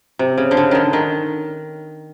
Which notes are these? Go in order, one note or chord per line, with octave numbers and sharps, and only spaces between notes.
C3
C#3
D3
C#3
D3 D#3
D#3